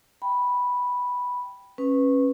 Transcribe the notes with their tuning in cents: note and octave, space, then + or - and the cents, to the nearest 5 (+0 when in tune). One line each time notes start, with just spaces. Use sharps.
G5 +0 B5 -5
C#4 -20 B4 +0